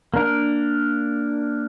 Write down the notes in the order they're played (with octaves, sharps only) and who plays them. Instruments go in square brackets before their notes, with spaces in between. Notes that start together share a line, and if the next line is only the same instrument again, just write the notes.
[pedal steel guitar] A#3 D4 A#4